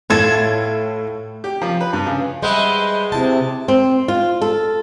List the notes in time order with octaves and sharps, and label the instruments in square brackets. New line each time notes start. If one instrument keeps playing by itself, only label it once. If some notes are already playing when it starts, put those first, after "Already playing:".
[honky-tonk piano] A2 G#6 [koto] F4 A4
[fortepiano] G4
F3
B4
G2
C#3
[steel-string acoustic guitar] G3 E5 F#5 [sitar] G#3 [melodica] B4 C5
[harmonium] C3 [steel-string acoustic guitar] E4 A5
[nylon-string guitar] C4
F4
A4